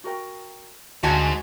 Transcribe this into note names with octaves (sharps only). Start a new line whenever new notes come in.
F#4 A#4 G5
D2 G#2 F#4 F5 G#5 A5